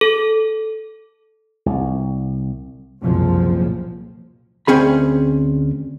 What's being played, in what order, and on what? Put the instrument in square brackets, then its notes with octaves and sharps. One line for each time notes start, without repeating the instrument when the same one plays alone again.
[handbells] A4
[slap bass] C2
[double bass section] F#1 C2 F2 A#2 F3
[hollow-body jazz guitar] D2 C4 C#4 G#4 B5